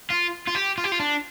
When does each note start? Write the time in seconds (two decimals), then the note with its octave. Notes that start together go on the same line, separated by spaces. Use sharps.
0.10 F4
0.48 F4
0.55 G4
0.78 F4
0.84 G4
0.92 F4
1.00 D4